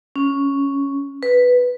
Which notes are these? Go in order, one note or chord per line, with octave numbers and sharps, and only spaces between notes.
C#4
B4